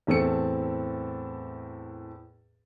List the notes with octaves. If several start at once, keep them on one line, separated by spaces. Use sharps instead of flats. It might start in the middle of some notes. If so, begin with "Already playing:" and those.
E2 A2 C4 A4 C#7